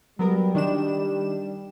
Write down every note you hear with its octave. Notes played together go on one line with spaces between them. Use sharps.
F#3 G3 B3 A#4
D#3 D4 E7